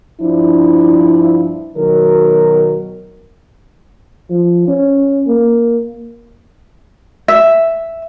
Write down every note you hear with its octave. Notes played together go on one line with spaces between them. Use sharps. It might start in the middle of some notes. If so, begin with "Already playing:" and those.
G2 F3 D4 E4
B2 D#3 F#3 A#4
F3
C#4
A#3
E5